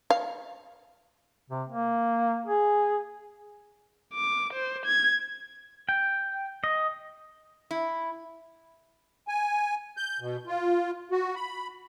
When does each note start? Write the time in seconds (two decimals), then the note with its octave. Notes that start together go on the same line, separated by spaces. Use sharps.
0.10 F5
1.51 C3
1.69 A#3
2.46 G#4
4.14 D6
4.53 C5
4.86 G#6
5.89 G5
6.64 D#5
7.71 E4
9.28 G#5
9.97 G6
10.20 B2
10.47 F4
11.12 F#4
11.36 B5